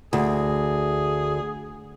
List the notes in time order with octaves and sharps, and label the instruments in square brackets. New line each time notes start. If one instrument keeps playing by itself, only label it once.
[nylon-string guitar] D2 [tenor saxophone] G#4